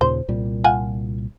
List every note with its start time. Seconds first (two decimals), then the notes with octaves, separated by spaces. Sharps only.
0.01 D#2 A#2 C#3 C5
0.28 C2 A#2 G3
0.64 F4 F#5 G#5